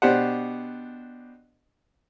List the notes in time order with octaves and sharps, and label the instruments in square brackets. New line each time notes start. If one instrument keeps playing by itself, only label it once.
[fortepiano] B2 D4 G4 C5 F#5